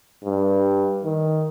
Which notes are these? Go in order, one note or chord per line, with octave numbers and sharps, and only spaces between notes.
G2
D#3